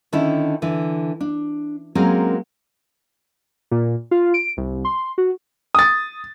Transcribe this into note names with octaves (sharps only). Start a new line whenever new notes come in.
D3 D#3 C#4 D4 E4
D3 E3
D4
F#3 G#3 A#3 C4 C#4 A#4
A#2
F4
D7
C2
C6
F#4
D#6 A6